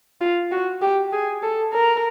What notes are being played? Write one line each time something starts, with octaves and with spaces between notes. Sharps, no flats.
F4
F#4
G4
G#4
A4
A#4